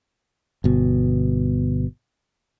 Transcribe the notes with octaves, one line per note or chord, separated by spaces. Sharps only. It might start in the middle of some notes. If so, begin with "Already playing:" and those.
G1 B2